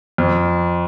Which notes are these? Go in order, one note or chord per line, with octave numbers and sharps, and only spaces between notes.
F2